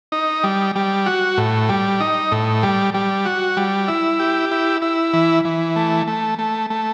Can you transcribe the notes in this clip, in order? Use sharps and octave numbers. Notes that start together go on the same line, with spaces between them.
D#4
G3
G3
F#4
A2
G3
D#4
A2
G3
G3
F#4
G3
E4
G4
E4
E4
E3
E3
A3
A3
A3
A3